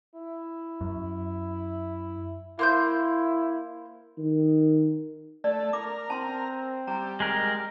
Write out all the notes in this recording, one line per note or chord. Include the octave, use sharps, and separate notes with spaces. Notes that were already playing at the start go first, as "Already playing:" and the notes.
E4
F#2
A#3 E4 C5 G6
D#3
A3 D5
A#4 D6
C4 A5 C6
G3 A#5
G#3 A#4